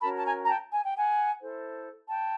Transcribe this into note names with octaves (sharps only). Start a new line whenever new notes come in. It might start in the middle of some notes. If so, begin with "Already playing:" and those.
C#4 F#4 A#4 A5 B5
A5
G#5 A#5
A#5
G5 A5
G#5
G5
F#5 G#5
E4 A4 C5
G5 A5